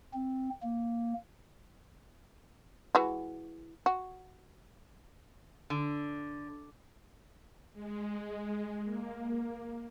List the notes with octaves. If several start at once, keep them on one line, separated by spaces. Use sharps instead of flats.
C4
A#3
E3 G#3 F#4
F#4
D3
G#3
A#3